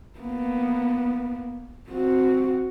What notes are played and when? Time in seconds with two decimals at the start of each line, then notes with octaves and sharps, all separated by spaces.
0.19 A#3 B3
1.89 C4 F#4